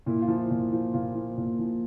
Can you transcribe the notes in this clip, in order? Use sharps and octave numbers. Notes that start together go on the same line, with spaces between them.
A#2 E4
F4
F3
E4
A#2
F3
A#2 F4
F3
A#2
F3